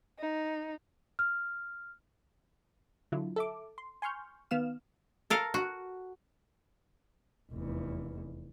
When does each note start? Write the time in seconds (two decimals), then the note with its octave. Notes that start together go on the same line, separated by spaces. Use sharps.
0.18 D#4
1.19 F6
3.12 D3 F#3 E4 F4
3.36 A4 E5 D6
3.78 C6
4.02 G#5 C6 C#6 F6 G6
4.51 D#3 B3 F5 F6 E7
5.30 A4 A#4 F5
5.54 F#4
7.52 F1 E2